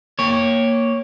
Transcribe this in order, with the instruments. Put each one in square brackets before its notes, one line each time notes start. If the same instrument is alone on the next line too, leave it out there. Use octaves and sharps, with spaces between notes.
[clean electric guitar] A#3 C#5